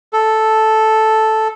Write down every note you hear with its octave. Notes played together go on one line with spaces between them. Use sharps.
A4